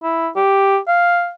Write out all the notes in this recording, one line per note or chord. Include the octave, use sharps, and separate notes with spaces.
E4
G4
F5